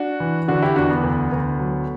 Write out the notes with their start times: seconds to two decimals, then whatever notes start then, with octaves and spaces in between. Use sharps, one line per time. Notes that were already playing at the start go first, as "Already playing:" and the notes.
Already playing: D4 F#4
0.20 E3
0.48 D3 D4 F#4
0.63 E4 G4
0.76 E2 D4 F#4
0.90 B3
1.04 D2
1.32 D2
1.59 F#3